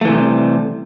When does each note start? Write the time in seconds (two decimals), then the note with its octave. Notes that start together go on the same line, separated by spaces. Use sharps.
0.01 A3
0.05 E3
0.09 C3
0.13 G3